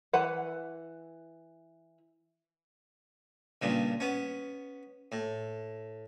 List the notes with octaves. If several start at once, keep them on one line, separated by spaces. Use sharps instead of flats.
E3 B4 F#5
G2 A#2 C#3
B3 C#4
A2